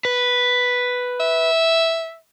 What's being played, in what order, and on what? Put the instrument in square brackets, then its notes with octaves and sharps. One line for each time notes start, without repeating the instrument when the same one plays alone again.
[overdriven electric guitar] B4
[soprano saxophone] E5